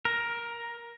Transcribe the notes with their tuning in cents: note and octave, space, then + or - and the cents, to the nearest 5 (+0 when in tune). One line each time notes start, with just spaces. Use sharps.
A#4 +10